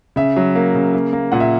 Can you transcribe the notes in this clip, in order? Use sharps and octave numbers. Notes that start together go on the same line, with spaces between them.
C#3 E5
F#3
A#3
C#3
A#3
A#3
A#2 F#5
E5